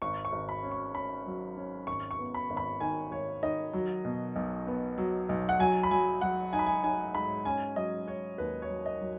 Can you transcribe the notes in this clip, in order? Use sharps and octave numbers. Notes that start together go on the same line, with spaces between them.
G#1 C#6
C#6
G#1
B5
C#4
C#6
C#4 B5
F#3
C#4
G#1 C#6
C#6
B3
B5
G#1
B5
D#3 G#5
G#1 C#5
D#3 D#5
F#3
B2
B1
B3
F#3
B1
F#5
F#3 G#5
B5
F#3 G#5
F#3 F#5
D#4 G#5
B5
G#5
D#4 G#5
G#2 B5
C#4 G#5
F#3 D#5
C#4 C#5
D#2 B4
C#5
F#3
D#5
F#3